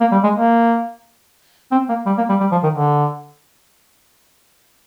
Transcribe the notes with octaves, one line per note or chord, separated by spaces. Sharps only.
A#3
G3
G#3
A#3
C4
A#3
G3
A#3
G3
G3
F3
D#3
D3